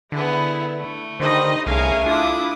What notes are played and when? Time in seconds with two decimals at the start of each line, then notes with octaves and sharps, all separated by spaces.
0.12 D3 B3 E4 G#4
0.78 A3
1.20 D3 D#3 D#4 G4 C5 D#5 B5
1.67 C2 A3 C#4 G#4 A#4 F5 G#5
2.06 D4 E4 F4 D6 D#6